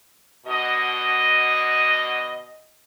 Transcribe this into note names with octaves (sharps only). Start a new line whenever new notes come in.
B2 D3 F#4 D#5